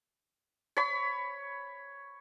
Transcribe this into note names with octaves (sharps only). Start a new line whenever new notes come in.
C#5 B5